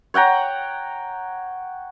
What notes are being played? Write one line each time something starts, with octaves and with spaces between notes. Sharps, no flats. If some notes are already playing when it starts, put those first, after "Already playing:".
C#5 F#5 G5 A#5